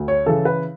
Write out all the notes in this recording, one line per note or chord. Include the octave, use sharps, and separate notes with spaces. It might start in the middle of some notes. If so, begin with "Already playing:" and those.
Already playing: D2
C#5
C#3 E3 A4
B4